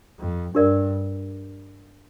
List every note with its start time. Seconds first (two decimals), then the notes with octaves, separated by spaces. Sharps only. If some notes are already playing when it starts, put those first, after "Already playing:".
0.20 F2
0.55 G2 D4 G4 A#4 D5